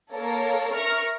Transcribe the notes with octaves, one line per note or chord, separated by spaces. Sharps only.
A#3 A4 A#4 C#5
A#4 E5 C#6 F6 A#6